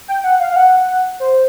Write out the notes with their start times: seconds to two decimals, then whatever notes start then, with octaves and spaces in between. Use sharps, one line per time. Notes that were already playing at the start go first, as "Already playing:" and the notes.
0.08 G5
0.24 F#5
0.40 F5
0.51 F5
0.56 F#5
1.20 C5